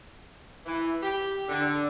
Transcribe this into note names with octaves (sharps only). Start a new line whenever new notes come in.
E3
G4
D3